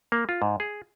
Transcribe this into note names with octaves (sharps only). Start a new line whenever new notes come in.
A#3
F4
G#2
G#4